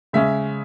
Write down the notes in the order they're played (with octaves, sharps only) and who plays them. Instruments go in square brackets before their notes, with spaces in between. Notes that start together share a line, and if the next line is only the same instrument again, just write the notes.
[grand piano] C#3 G#3 C#4 E5